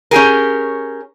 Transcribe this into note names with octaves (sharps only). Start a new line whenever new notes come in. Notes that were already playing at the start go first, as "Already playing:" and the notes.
C#4 G4 G#4 A#4